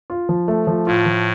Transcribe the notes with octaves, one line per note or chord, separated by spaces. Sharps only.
F4
F3
A3
F3
A2 F4
F3